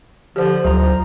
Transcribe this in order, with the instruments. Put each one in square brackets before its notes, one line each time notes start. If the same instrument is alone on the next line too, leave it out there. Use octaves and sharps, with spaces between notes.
[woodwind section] D3 F3 [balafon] G4 C5
[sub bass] D2 [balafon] F#3 [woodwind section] F4 C5 A#5